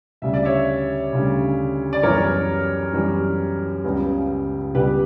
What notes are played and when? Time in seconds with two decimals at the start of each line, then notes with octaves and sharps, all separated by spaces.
0.22 D2 C#3 G3 E5
0.34 D5
0.45 C#5 E5
1.13 D2 C#3 G3
1.93 D5
2.03 F#2 E3 G3 B3 A#4 C#5
2.93 F#2 E3 G3 B3
3.84 C#2 C#3 G3 B3
4.75 C#2 C#3 G3 B3 G4 B4